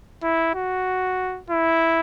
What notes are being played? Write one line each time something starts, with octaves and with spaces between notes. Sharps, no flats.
E4
F#4
E4